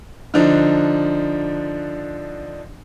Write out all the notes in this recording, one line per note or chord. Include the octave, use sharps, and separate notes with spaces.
D3 F3 D4 D#4